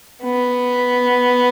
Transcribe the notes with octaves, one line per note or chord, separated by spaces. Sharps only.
B3